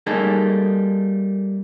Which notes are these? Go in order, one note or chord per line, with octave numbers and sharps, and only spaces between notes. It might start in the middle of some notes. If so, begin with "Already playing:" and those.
G3 A3 A#3 D#4 G#4 A4